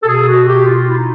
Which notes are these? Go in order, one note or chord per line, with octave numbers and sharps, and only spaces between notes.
A4
B2 G#4
F#4
G4
F4
E4
D#4